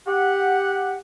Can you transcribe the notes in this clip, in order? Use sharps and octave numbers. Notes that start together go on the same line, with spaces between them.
G4 F#5